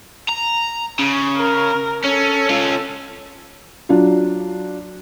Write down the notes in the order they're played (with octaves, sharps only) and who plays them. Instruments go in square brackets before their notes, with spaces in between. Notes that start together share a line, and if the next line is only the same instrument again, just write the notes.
[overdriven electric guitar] A#5
C#3
[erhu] A#4
[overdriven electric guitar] C#4 [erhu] A4
[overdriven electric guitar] C#4 F4
[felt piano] F#3 D4 F4